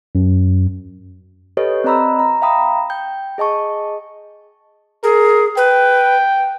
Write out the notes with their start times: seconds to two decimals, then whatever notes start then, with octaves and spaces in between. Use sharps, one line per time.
0.15 F#2
1.57 G4 A4 B4 C#5 D#5
1.84 C4 D5 D#5 A#5 B5 E6
2.19 A#5
2.42 E5 F5 G5 A#5 B5 D#6
2.90 G5 G6
3.38 G#4 D#5 A5 C#6
5.04 G#4 A#4
5.57 B4 G5